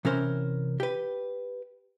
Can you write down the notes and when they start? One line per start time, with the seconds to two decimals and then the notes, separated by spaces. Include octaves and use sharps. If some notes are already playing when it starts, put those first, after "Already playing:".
0.05 C3 E3 C#4 A#4 C5
0.80 G4 B4